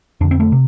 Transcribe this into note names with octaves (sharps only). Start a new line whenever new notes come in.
F2 D3 D4
C4
A3
C3